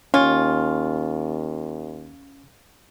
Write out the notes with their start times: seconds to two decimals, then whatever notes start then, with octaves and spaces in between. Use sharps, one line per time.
0.14 D#2 C#4 F4 G#5 C#6